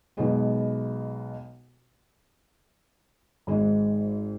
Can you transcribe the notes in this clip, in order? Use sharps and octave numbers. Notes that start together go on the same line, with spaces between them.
B1 B2 G#3 B3
G#1 G#2 G#3